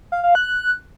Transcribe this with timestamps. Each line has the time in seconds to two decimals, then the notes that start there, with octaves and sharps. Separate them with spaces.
0.12 F5
0.24 F5
0.35 F#6